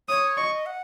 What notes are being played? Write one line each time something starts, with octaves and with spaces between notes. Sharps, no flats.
C#5 D#6
D#5 C#6
F#5